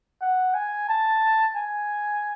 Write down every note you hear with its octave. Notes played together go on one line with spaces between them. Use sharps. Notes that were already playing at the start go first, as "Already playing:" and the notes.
F#5
G#5
A5
G#5